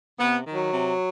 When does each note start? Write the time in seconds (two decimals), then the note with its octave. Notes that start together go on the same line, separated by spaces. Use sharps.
0.19 C3 B3
0.46 D#3
0.54 F#3
0.72 C3